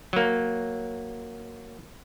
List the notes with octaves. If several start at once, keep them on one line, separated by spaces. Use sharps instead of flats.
F#3 A#3